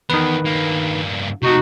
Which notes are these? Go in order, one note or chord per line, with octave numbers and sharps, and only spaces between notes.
E2 D#3 B4
G2 A#3
C3 A3 D#4 F#4